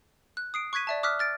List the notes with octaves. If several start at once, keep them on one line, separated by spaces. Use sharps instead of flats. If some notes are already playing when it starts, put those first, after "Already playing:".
F#6
D#6 C7 D7
C#6 F#6 G#6 B6 D#7
D5 E5 A5
D6 D#6 F6 F#6 B6
F6 A6 D7